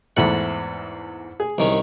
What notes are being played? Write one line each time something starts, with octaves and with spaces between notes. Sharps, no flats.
E2 G#2 A3 F#5 B5
G#4
C2 D#3 C#4